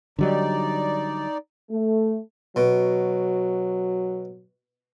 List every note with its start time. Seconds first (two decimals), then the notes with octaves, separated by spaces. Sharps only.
0.19 D3 F#3 G3 D#4 D5
1.71 A3
2.56 B2 F#3